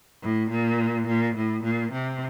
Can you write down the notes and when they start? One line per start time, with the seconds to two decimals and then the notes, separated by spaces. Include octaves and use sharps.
0.22 A2
0.50 A#2
1.07 A#2
1.35 A2
1.63 A#2
1.92 C3